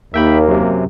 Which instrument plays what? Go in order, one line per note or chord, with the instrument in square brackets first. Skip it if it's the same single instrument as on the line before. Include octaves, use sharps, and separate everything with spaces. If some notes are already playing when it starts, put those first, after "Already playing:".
[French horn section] D#2 [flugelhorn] A#3 [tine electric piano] E5 G5 B5
[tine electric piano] F#2 C3